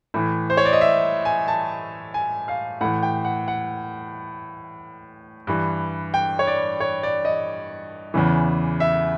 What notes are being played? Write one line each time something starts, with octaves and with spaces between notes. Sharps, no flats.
A2 E3
C5
C#5
D5
D#5
E5
G#5
A5
G#5
F5
A2 E3 F#5
G5
F#5
F#5
G2 E3
G5
C#5
D5
C#5
D5
D#5
E2 C#3 E3
E5